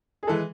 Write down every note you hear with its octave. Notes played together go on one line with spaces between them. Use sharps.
G#4
E3 G#3 A4